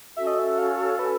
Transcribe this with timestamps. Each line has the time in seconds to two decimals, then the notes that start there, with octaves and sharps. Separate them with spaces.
0.17 C#4 F#4 A4 E5
0.27 D#5
0.39 E5
0.58 F5
0.99 B4